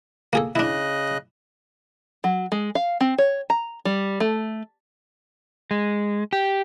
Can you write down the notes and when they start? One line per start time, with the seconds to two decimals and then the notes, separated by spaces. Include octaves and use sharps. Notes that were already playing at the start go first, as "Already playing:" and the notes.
0.33 A#3 G#4 A4
0.56 C#3 D4 E4 D#5 F#6
2.24 F#3
2.52 G#3
2.75 F5
3.01 C4
3.18 C#5
3.50 A#5
3.85 G3
4.20 A3
5.71 G#3
6.33 G4